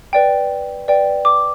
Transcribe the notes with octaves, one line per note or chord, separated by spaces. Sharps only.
B4 D5 G5
B4 D5 G5
D6